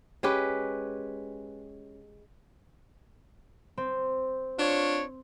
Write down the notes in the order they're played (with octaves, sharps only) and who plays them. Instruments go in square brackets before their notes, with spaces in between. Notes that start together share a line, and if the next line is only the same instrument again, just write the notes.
[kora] G#3 C#4 G4 B4
[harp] C4
[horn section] D4 F4 C#5